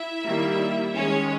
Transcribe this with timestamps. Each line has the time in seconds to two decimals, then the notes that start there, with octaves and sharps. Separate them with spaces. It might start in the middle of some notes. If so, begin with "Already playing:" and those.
Already playing: E4 E5
0.24 D#3 G3 A#3
0.95 D#3 G#3 C#4 C#5